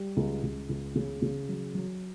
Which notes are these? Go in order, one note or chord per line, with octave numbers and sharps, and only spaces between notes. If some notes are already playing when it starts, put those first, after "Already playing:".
Already playing: G3
C#2
C#2
C#2
C#3
C#3
F#3
F#3